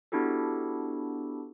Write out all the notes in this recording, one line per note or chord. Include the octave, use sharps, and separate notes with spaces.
B3 D4 E4 F#4 G4 A4